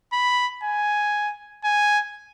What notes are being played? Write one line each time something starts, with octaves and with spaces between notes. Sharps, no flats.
B5
G#5
G#5